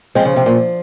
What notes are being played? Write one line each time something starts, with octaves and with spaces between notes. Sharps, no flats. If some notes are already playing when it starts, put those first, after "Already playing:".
F3 G#3 C4
C#3
C3
A#2